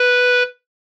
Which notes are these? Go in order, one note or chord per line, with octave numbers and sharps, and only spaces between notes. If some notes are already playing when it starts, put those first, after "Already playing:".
Already playing: B4